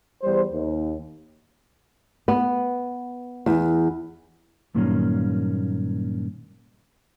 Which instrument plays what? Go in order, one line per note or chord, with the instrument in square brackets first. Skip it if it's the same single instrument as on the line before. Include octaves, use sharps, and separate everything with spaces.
[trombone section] E2 G3 C5
D#2
[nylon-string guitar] B3
E2
[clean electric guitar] G2 A#2 D#3 F#3 A#3 C#4